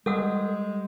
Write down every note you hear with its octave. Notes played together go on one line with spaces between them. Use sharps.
G3 G#3 A4 F#5 D#6